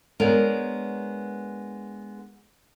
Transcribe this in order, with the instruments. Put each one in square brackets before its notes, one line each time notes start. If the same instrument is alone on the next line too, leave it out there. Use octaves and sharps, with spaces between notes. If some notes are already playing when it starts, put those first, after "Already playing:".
[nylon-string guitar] G#3 B3 D4 A#4 C#5